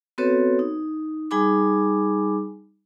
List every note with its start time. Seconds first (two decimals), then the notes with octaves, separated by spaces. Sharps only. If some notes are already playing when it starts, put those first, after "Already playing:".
0.18 B3 C4 F#4 A4 B4 C#5
0.59 D#4
1.31 G3 D#4 G#4 G#5 B5 D6